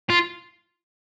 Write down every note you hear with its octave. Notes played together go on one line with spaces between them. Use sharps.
F4